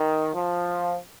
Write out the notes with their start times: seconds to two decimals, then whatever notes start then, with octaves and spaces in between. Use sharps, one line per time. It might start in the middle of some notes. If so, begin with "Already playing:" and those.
Already playing: D#3
0.34 F3